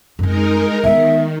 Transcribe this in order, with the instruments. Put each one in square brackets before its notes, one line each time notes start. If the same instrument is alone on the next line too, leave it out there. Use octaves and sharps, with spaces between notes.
[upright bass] F#2 C4 [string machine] G#3 D#4 A#4
[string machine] D#3 [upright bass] G#3 B3 [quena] E5